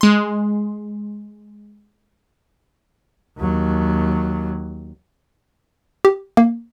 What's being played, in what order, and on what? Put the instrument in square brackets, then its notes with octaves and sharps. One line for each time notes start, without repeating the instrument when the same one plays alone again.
[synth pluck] G#3 C6
[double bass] D#2 F#3
[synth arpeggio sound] G4
A#3